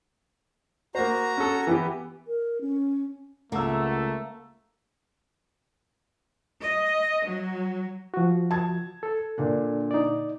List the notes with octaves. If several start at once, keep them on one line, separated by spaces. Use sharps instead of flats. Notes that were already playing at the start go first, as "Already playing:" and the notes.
A#3 F#4 C5 A#5
C#4 A4
E3 B3 G4
A#4
C#4
C#2 A3 A#3 F#5 A#5 E6
D#5
F#3
F3 F#4
A5 G#6
A4
A#2 D3 D4
D#4 D5